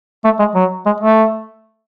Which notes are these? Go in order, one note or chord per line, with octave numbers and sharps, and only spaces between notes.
A3
G#3
F#3
G#3
A3